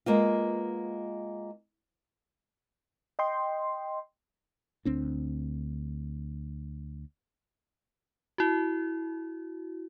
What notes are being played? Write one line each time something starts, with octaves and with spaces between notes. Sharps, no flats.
G#3 A#3 B3 F4
D#5 G5 C6
D2 C4 D4
E4 F#4